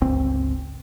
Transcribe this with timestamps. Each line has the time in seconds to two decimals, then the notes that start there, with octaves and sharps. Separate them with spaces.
0.01 G1 C#2 C4